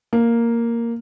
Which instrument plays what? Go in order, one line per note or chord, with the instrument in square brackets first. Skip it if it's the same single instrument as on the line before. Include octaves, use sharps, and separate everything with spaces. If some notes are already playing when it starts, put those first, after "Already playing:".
[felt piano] A#3